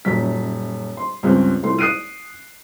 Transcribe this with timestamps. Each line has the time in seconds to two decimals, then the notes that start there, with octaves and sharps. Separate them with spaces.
0.05 D#1 F#2 B6
0.97 C6
1.23 C#2 G2 C4 C#4
1.63 C2 A3 F4 C6
1.79 D#6 F#6 C7 D7 D#7